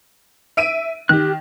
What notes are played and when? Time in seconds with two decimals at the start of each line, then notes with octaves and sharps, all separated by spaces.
0.57 E5 D7 D#7
1.09 D#3 G4 F#6